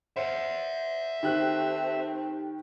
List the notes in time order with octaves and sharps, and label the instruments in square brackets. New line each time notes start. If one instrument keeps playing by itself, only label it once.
[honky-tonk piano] C5 [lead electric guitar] E5 F#5
[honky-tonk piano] D#3 G4 F#6 [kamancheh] A3 C4